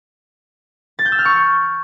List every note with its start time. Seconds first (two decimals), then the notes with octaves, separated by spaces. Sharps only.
0.99 A6
1.05 G6
1.12 E6
1.19 F6
1.25 C#6